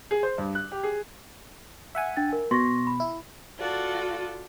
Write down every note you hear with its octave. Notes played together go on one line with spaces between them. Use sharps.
G#4
C5
G2
F#6
G4
G#4
E5 F#5 G#5
D4 G5 A6
A#4
B2 C6 C#6 A#6
B5
E4
F4 F#4 A4 D5